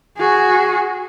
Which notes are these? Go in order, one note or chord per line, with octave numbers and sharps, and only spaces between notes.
F#4 G#4